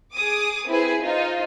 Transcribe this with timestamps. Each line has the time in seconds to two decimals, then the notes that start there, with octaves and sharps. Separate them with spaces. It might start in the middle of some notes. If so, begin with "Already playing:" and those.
0.14 G#4 D6 D#6
0.68 C4 E4 G#4 B4
1.02 D#4 F4 C5